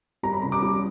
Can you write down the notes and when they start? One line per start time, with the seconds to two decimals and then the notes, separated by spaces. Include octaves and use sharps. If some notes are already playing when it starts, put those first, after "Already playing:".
0.23 G3 A#5
0.33 B5
0.42 C#3 A#5
0.52 D6
0.62 G3